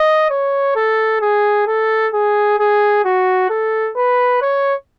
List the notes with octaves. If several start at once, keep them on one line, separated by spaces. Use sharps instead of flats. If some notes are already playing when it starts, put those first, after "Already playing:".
Already playing: D#5
C#5
A4
G#4
A4
G#4
G#4
F#4
A4
B4
C#5